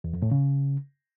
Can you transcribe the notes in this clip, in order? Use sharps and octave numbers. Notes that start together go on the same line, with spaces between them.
E2
F2
A2
C#3